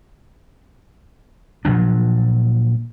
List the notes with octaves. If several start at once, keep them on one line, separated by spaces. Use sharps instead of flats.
A#2 F3 F#3 D4